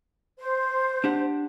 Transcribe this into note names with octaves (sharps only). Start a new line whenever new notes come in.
C5
D4 G4 F#5